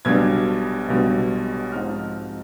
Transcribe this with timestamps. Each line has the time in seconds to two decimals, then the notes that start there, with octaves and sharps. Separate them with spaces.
0.05 B1 B2 G3 D4 G#6
0.88 B1 B2 G3 D4
1.72 G#2 F3 C4 D#4 F6